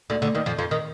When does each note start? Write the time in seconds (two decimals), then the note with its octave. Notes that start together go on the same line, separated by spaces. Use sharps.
0.10 D2 D3
0.22 D2 D3
0.35 D#2 D#3
0.46 F2 F3
0.58 F2 F3
0.71 D#3